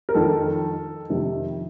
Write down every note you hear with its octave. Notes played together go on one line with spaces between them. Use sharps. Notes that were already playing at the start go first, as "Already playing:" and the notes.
A#4
F2 D#3 A4
F2 C3 D#3